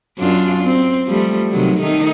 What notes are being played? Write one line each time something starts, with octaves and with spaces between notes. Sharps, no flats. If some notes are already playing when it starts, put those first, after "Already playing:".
F#2 D4 F4
C4
F3 G3 A3
C3 D#3 F#3
D#3 A3 D#4